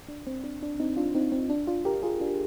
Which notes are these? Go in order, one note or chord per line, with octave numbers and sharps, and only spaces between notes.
D4
C4
D4
D4
C4 D#4
D4 F4
C4 D#4
C4
D4
D4 F4
G4 A#4
F4 G#4
D4 F4